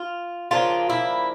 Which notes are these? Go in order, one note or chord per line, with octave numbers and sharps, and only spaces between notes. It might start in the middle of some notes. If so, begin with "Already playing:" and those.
Already playing: F4
C#3 F3 A#3 D4 F4
E4